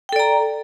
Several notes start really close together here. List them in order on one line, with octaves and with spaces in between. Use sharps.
G5 A4 D5 A#5